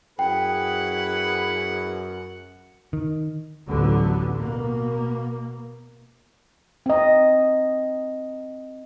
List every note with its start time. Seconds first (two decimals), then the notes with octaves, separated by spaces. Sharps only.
0.19 F#2 E4 G#4 B4 F#5 G5
2.93 D#3
3.68 A1 D2 D3 F#3 B3
4.37 B2 A#3
6.86 C4 D#5